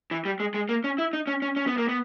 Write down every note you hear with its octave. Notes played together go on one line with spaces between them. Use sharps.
E3
G3
G#3
G#3
A#3
C#4
E4
D#4
C#4
C#4
C#4
B3
A#3
B3